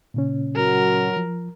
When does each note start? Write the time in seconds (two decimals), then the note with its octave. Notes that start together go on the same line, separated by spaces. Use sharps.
0.14 A#2 C#3 C#4
0.56 F#3 F#4 A#4
1.17 F3